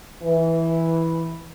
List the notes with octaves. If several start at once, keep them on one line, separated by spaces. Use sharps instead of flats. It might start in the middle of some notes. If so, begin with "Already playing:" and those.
E3